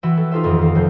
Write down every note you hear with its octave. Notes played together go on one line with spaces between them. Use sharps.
E3 F#4 B4 E5 G5
A4
D#4 F4 G4 A4 C5 E5
D#1 F2 D#3 B3
F5
F1 F2 G6 C7